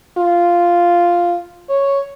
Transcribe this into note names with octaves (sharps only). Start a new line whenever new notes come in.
F4
C#5